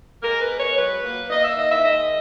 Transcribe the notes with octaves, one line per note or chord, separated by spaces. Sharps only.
G#3 A#4
B4
B3
C#5
F#3 B4
A#3
A#3 D#5
E5
D#3 D#5
E5
G#3 D#5